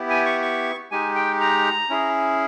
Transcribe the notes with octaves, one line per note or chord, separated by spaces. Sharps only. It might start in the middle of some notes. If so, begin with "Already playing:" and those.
Already playing: B3 E4 G4
G#5
C#6
C#6
G#3 D#4 G4 G#5
G5
A#5
C#4 E4 G#4